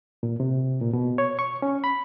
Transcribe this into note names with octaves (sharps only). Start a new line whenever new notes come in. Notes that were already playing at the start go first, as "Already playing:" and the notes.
A#2
C3
A#2
B2
C#5
C#6
C#4
B5